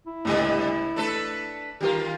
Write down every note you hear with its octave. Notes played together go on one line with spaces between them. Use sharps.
E4
C#2 A2 D3 G3 B3
A3 D4 A4 B4
D#3 G3 F4 G4 A#4